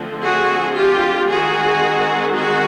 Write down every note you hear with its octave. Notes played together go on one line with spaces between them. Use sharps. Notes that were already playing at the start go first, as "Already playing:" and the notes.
Already playing: D3 F3 A3 C4
F#4 G#4
F4 G4
D#3 G#3 C4 F#4 G#4
F#4 G#4